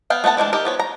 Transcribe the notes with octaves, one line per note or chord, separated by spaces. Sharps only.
B3 F5 G5
A3 B3 F#5 A5
E3 G#3 A3 D4
D#4 G4 A#4
F3 B3 C#5
A#5